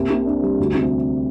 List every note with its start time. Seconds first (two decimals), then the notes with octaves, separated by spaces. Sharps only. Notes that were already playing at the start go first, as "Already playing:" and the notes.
Already playing: C2 A#3
0.10 C3
0.26 D4
0.43 G3
0.59 D2
0.75 C3